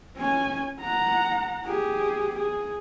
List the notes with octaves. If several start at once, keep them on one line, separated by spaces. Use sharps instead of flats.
C#4 G#5
F#5 A#5
G4 G#4
G#4